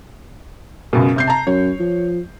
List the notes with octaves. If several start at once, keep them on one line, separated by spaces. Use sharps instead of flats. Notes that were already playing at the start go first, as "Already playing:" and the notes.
C#2 F#2 B2
C3 G6 C7
A5 A#5
F#2 C#5
F3